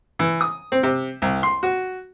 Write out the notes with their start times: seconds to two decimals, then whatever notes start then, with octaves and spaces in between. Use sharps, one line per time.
0.19 E3
0.41 D#6
0.72 C4
0.83 C3
1.22 C2
1.43 C6
1.63 F#4